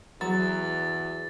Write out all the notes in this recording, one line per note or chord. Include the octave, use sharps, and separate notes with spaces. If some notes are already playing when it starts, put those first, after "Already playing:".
E2 F#3 A6